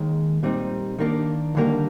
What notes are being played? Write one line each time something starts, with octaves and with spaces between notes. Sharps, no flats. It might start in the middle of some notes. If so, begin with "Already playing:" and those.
Already playing: D#2 D#3 G#3
A#2 G3 C4 D#4
D#3 A#3 D4
D#2 D3 G3 A#3